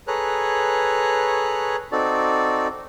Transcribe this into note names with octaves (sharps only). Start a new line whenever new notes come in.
G#4 A4 B4 C#5 A#5 F#6
C4 D#4 F#4 A4 D5